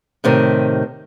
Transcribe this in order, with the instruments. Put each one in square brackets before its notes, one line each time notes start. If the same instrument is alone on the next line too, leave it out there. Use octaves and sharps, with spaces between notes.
[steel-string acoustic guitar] A2 C3 D#3